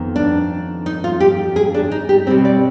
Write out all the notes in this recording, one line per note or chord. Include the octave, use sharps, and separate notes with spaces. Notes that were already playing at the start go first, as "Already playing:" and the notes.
Already playing: F2 D#3 B3
D4
D#4
F4
G4
G#4
D4
D#4
G4
B2 G3 C4
D5